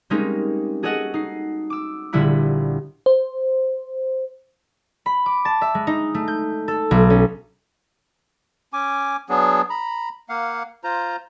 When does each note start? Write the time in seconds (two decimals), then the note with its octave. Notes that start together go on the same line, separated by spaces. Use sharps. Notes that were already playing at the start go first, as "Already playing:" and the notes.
0.10 G3 G#3 A#3 C4 C#4 D#4
0.83 F#4 G#4 A4 C#5 D#5 F#5
1.14 D#4 C7
1.70 D6 E6
2.13 A#1 D3 G3 E4 F#5 B5
3.06 C5
5.06 B5
5.26 D6
5.45 A5
5.61 E5
5.75 G#3
5.87 D#4
6.14 A3
6.28 G6
6.68 A4
6.91 B1
7.10 C#4
8.73 C#4 G#5 D6
9.29 F#3 B3 D4 G#4
9.70 A#5 B5
10.29 A#3 F5 F#5
10.84 F4 C5 A#5